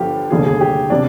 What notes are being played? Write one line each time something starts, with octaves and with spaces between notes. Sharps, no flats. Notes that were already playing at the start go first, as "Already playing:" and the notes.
Already playing: G1 G2 D3 F3 G4
F1 D#2 D3 G3 G#4
G#4
G4
C3 G3 D4